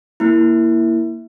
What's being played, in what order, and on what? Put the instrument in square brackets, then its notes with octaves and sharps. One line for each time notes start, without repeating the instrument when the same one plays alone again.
[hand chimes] A#3 E4